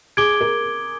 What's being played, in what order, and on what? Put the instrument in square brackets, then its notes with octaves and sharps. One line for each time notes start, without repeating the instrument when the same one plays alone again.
[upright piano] G#4 [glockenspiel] D6 G#6 D7 G7
[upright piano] A#4